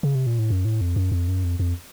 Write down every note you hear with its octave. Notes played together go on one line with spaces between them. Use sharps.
C#3
C3
A#2
A2
F#2
A2
F2
F#2
F2
F#2
F2
F2